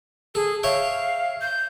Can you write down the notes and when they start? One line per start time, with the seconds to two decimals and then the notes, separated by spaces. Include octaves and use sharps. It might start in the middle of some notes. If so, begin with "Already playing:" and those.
0.35 G#4 A4
0.63 C#5 E5 F5 G5
1.41 G6